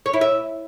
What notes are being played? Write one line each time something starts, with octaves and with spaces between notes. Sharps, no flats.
C#5
E4
E5